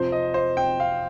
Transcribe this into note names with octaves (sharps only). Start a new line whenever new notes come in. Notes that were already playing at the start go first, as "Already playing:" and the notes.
Already playing: F2 C3 F3 C5
D#5
C5
G5
F5